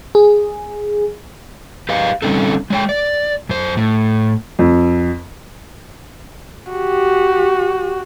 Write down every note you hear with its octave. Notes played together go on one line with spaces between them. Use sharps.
G#4
G4 B4 D#5 F5
D3 G3 C4 C#4 D#4 A4
G#3 C#5 G5
D5
F#2 C5
A2
F2
F#4 G4